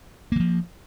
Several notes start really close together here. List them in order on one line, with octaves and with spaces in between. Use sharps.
A#3 E3 F3